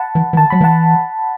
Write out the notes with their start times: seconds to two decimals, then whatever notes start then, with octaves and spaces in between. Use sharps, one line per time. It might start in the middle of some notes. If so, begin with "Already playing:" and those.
Already playing: F#5 A5 B5
0.15 E3
0.33 E3
0.37 D#3 A5
0.50 F#3 B5
0.61 E3 F#5 A5